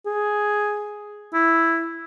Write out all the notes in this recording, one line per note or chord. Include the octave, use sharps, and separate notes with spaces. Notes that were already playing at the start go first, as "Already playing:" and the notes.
G#4
E4